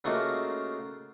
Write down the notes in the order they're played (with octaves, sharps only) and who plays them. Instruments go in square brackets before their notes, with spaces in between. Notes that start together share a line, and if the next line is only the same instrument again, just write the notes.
[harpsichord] C#3 A3 A#3 D#4 F4 F#4